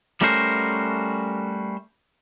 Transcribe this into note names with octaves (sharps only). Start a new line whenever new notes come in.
G3 A3 C#4 F#4 A#4 C5